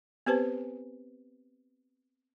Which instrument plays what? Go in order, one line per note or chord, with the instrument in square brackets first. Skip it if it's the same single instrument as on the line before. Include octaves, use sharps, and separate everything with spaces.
[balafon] B3 C4 G4 B4 C5 A5